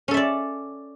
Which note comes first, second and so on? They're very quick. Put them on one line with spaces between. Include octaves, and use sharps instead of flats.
C#4 A4 E5 D5